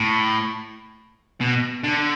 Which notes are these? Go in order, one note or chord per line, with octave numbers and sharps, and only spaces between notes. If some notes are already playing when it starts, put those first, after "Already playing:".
Already playing: A2
B2
D3